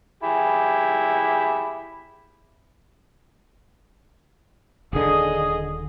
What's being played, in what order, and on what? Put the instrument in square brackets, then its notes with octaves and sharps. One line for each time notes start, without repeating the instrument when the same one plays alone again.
[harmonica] E4 G4 G#4
[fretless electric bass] D#1 D3 [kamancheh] G#4 D#5